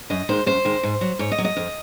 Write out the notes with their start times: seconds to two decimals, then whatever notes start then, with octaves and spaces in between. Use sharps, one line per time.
0.10 F#2 D#5
0.29 D#3 G#3 C5
0.46 F#2 C5
0.65 D#3 G#3
0.83 G#2
1.01 F#3
1.19 G#2 C#5
1.32 D#5
1.38 F#3
1.44 D#5
1.57 F2